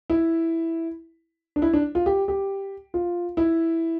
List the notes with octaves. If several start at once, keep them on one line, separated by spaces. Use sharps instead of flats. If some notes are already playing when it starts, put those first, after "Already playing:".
E4
D4
E4
D4
F4
G4
G4
F4
E4